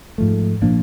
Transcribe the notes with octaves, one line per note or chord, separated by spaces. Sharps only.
G#2 F3 A3
A#2 F3 A#3 D4